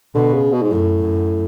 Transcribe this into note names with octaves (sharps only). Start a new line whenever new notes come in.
B2 D3
C#3
B2
G#2
F#2 A2
F#2